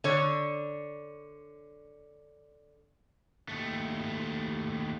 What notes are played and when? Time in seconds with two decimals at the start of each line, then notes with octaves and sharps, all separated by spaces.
0.04 D3 C#5
3.49 D#2 A3